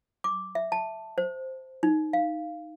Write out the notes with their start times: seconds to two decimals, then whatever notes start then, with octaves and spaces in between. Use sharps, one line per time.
0.24 D6
0.55 E5
0.72 A5
1.18 C5
1.83 D#4
2.13 F5